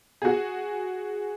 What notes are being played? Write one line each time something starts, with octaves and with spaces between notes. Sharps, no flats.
F#4 G#4